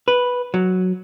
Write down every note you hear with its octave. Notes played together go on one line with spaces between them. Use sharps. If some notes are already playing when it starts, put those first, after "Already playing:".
B4
F#3